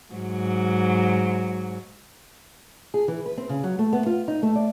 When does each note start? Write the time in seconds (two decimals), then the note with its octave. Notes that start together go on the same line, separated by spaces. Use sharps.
0.14 G#2 F#3
2.94 G#4
3.08 E3
3.26 B4
3.37 C4
3.49 C#3
3.64 F#3
3.79 A3
3.93 B3
4.06 F4
4.28 D#4
4.43 A3
4.55 D5